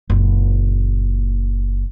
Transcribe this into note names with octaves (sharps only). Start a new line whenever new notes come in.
F#1 A#2